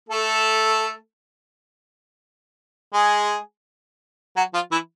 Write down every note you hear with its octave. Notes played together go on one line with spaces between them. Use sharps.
A3 A4
G#3 G#4
F#3 F#4
F3 F4
E3 E4